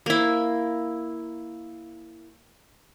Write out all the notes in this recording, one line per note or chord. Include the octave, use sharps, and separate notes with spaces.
A#3 E4